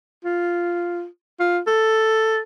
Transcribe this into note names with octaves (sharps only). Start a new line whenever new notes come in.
F4
F4
A4